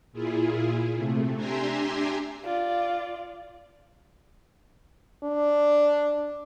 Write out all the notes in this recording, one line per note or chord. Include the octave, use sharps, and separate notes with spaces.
A#2 E4 F4 G#4
C3 A3
D4 G4 E5 G#5 A#5 C6
F4 D5
D4